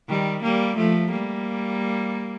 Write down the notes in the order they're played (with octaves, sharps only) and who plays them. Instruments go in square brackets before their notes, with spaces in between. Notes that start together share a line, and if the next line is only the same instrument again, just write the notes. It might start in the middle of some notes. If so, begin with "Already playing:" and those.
[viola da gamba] D#3 G3
G3 A#3
F3 A3
G3 A#3